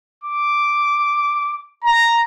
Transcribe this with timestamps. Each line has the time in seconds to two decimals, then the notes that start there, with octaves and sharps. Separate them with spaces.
0.24 D6
1.84 A#5